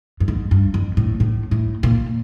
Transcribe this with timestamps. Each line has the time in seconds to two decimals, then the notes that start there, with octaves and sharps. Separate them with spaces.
0.20 G2
0.28 G#2
0.51 G2
0.74 F2
0.97 A2
1.20 A2
1.51 A2
1.83 A#2